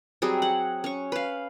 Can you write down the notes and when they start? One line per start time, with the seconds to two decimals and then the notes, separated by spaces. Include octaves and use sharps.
0.22 F#3 G3 C4 G#4
0.42 F#5
0.84 C#4 C#6
1.12 B4 F5